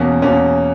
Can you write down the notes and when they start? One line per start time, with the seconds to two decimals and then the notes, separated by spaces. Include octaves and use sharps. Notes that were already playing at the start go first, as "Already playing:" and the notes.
Already playing: E2 B2 A#3 C#4
0.22 E2 B2 A#3 C#4